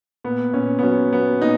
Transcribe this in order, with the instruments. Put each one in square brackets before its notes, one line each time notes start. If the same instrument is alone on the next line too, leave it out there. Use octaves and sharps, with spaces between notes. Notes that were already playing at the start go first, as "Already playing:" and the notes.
[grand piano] A#2 B3
A#2 C#4
B3
F#3 C#4
F#3 B3
A#2 D#4